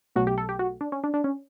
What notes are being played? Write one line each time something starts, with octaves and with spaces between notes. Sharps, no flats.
B1 B2 F#3 A3 F#4
G4
A4
G4
F#4
D4
C#4
D4
D4
C#4